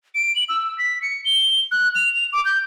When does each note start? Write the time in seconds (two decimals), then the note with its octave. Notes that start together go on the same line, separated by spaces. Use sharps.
0.15 D7
0.36 F#7
0.49 E6
0.78 B6
1.02 C#7
1.25 G7
1.71 F#6
1.95 F7
2.14 F7
2.33 D6
2.45 G6